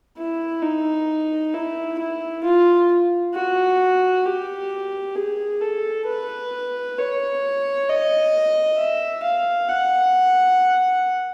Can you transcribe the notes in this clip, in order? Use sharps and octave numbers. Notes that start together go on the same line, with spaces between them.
E4
D#4
E4
E4
F4
F#4
G4
G#4
A4
B4
C#5
D#5
E5
F5
F#5